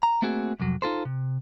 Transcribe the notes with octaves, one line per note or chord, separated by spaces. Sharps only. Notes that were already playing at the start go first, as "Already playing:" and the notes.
A#5
A3 A#3 C4 F#4 G#4
C2 F2 F#3
D#4 F4 A4 C5
C3